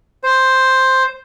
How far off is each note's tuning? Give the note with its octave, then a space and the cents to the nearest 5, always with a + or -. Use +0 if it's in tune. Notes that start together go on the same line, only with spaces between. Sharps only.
C5 +5